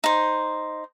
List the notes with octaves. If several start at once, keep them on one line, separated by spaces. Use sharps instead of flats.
D#4 C5